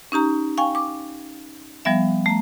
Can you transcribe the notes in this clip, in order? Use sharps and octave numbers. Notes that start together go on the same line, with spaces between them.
C#4 D#4 G4 A#5
F5 G5 G#5 C#6
D6
F3 G3 B3 E5
A3 A#5